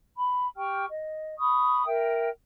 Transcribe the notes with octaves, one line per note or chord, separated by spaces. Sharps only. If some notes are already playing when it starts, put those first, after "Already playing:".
B5
G4 G5 C#6 F6
D#5
B5 C#6 D#6
A#4 E5 G5